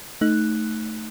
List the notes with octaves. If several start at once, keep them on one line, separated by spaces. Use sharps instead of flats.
A3 D#4 F#6